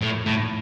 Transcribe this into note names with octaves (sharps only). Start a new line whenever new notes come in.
A2
A2